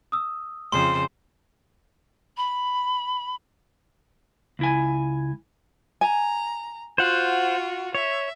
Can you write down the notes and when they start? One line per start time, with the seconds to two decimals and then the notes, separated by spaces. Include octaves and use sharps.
0.12 D#6 E6
0.72 F2 C#3 C5 C6
2.37 B5
4.59 C#2 E4 G#5
6.01 G#5 A#5
6.98 F4 F#4 C5 F#5
7.95 C#5 E5